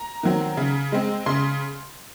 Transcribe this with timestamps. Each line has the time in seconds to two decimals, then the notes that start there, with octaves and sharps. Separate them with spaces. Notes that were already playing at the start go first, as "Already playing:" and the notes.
Already playing: A#5
0.23 D#3 F#3 C4
0.57 C#3
0.92 G#3 C4
1.26 C#3 C6